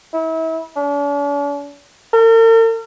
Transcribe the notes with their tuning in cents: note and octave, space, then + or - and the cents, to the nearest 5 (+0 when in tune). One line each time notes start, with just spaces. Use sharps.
E4 -35
D4 -45
A#4 -45